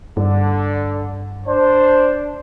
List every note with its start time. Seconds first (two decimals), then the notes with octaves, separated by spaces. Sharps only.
0.17 G2 D3
1.47 D4 C5